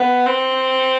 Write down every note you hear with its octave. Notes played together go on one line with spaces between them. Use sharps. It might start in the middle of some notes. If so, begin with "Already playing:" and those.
Already playing: B3
C4